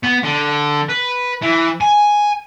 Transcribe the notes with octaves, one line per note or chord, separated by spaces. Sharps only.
B3
D3
B4
E3
G#5